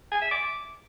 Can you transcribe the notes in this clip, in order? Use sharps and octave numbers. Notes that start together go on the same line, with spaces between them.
G#5
E5
D6